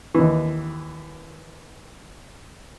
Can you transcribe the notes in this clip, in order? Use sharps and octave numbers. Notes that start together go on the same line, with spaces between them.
D#2 E3